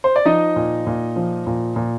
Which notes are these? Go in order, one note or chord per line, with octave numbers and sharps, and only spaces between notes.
C5
D5
F3 D#4 D#5
A#2
A#2
F3
A#2
A#2